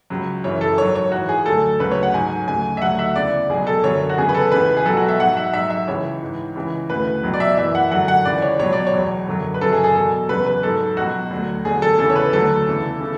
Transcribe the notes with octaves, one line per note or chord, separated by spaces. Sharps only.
C#2 C#3 F#3
F#2 C#3 E3 C#5
A4
G#2 F#3 C#5
C#5
G#2 E3 F#4
G#4
D2 D3 F#3 A4
D2 C#3 F#3 B4
C#5
F#5
G#2 F#3 G#5
D2 C#3 F#3 G#5
E5
D2 D3 F#3 F#5
E5
E2 C#3 E3 D5
C#2 B2 F#3 G#4
A4
F#2 D3 F#3 C#5
F#4
E2 C#3 F#3 G#4
B4
A4
C#2 C#3 E3 B4
G#4
C#2 B2 F#3 A4
F#4
E5
G#2 F#3 F#5
E5
G#2 F#3 E5
E5
C#2 C#3 E3 C#5
G#2 E3
C#2 C#3 E3
D2 C#3 E3 B4
C#2 B2 F#3
D5
E5
F#2 E3 E5
F#5
F#2 D3 F#3 F#5
F#5
C#2 C#3 E3 D5
C#5
C#2 B2 F#3 C#5
D5
C#5
E2 B2 F#3
F#2 D3 F#3
B4
F#2 C#3 F#3 A4
G#4
G#4
E2 B2 F#3 A4
E2 C#3 F#3 B4
B4
G#2 F#3 A4
C#2 B2 F#3 F#4
D2 D3 F#3
E2 D3 F#3 G#4
A4
E2 C#3 E3 A4
C#5
B4
D2 D3 F#3 A4
E2 C#3 E3
C#3 E3